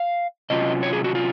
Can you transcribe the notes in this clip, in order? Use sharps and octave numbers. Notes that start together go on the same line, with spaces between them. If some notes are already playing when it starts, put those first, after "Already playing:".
Already playing: F5
C3 F#3 C#4 F4 D#5
C#5
G#4
F#4
F4